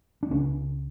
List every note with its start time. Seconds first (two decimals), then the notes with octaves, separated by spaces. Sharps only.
0.23 D4
0.30 C#2 C#3 C#4